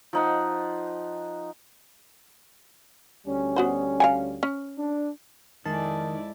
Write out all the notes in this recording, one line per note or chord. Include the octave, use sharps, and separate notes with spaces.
F3 D#4 F#5
D2 G3 C#4
B3 F#4 C5
F5 F#5 G#5
C#4
D4
F2 D#3 G#3 E4 D5 A5